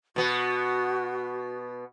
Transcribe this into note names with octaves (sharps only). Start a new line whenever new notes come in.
B2 B3 F#4